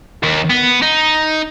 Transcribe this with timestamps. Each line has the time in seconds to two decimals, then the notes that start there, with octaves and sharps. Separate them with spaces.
0.23 D#2
0.50 B3
0.82 D#4